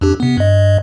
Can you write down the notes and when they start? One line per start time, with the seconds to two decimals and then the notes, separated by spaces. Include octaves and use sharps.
0.01 F2 D4 G4
0.20 C3 B3
0.37 G2 D#5